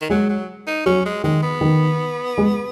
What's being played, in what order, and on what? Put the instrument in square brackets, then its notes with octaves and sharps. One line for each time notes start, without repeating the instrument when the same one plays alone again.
[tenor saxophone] D#3
[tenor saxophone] F#3 [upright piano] G#3
[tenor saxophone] F#3
D#4
[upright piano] F#3 [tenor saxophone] C#4
[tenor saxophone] G#3
[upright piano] D#3 [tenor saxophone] G#3
[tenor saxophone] B3
[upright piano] D#3
G#3